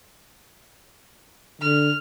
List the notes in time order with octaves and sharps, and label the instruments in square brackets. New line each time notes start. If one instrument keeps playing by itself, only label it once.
[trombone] D3 [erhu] F6